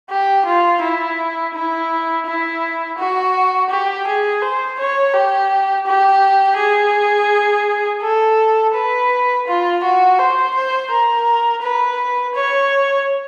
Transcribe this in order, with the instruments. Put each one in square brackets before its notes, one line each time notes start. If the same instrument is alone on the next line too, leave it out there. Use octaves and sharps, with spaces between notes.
[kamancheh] G4
F4
E4
E4
E4
F#4
G4
G#4
C5
C#5
G4
G4
G#4
A4
B4
F4
F#4
C5
C5
A#4
B4
C#5